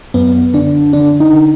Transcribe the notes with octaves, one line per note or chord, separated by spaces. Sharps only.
F#2 B3
D3 D4
D3 D4
D#4
D3